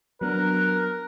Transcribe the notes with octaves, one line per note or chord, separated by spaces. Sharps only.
F#3 B3 D4 A#4 F#6